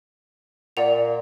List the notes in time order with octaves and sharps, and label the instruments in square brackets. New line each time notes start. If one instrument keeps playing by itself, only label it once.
[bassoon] A#2 [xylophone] D5 F#5 F7